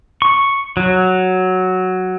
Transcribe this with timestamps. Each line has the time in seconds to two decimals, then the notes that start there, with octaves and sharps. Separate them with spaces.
0.22 C#6
0.77 F#3